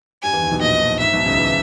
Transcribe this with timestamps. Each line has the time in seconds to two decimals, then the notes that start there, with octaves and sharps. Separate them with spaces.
0.23 G2 G3 G#5
0.33 E2 E3
0.42 D#2 D#3
0.51 B1 B2
0.61 A#1 A#2 D#5
0.81 A#1 A#2
1.00 G#2 E5
1.13 B1 B2
1.26 C#2 C#3
1.39 E3